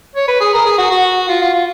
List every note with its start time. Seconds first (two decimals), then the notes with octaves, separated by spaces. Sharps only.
0.16 C#5
0.28 B4
0.40 G#4
0.53 A#4
0.66 G#4
0.78 F#4
0.91 F#4
1.29 F4
1.41 F4
1.53 F4